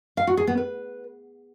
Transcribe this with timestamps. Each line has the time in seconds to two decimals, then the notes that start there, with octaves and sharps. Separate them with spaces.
0.17 F5
0.27 F#4
0.37 G#4
0.47 B3
0.57 B4